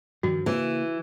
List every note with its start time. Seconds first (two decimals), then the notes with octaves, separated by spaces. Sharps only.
0.23 G2 D#3 F3 F#4
0.46 C#3 E3 A#3